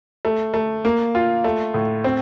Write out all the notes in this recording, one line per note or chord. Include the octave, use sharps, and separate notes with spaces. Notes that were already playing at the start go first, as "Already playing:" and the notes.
A3
A3
A#3
F4
A3
A2
C4